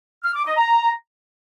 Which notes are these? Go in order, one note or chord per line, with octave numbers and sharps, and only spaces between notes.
F6
D6
D#5
A#5